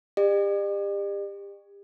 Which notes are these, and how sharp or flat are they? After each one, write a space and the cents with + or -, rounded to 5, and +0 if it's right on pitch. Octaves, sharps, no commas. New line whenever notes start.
G4 +30 D5 +45